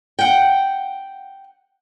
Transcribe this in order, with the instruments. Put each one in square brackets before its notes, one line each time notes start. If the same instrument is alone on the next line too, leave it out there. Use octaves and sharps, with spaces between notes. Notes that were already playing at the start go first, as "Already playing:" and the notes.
[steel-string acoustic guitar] F#5 G5